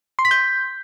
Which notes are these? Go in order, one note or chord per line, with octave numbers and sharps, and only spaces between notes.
C6
B6
G6